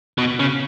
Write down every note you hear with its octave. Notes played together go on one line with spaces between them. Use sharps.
B2
C#3